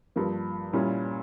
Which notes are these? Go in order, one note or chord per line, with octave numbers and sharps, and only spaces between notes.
G2 F3 A#3
A#2 G3 C#4 E4